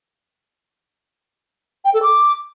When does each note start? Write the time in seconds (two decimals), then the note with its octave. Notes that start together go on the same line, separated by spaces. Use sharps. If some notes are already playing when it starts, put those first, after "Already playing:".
1.85 G5
1.94 A4
2.03 D6